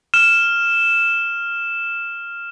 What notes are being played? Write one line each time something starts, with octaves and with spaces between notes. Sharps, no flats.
F6 E7